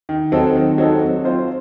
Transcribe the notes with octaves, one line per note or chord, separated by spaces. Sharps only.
D#3
F#3 C4 D#4 A4
D#3
F#3 C4 D#4 A4
F#3
C4 F4 C5